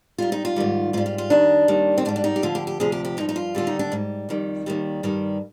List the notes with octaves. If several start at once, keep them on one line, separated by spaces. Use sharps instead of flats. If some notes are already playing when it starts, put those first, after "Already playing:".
G#2 G3 F4
D#4
F4
G#2 D#3 G3
G#2 G3 F4
F4
F4
F2 D#3 G3 D4
D#2 D#3 G3
C4
G#2 G3 D4
D4
D#4
G4
D2 D3 F3 F4
G4
G4
D2 C3 F3 G#4
G4
G4
G2 F3 D#4
D#4
F4
D#2 D3 G3 F4
D#4
D4
G#2 G3
F2 D#3 G3
D#2 D#3 G3
G2 D#3 G3